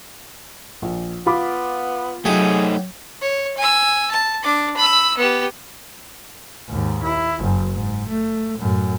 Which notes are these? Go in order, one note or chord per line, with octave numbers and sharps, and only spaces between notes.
A#1
B3 F4 B5 D6
F#3 A3 D#4 G4 G#4
C#5
G#5 E6
A5
D4 D6
B5 E6
B3 G4
D#2 G#2
E4
F#1 F#2
G#2
A3
F#2 A2